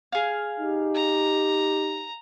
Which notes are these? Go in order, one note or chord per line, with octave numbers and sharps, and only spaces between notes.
G#4 F5
D#4 G4
A#5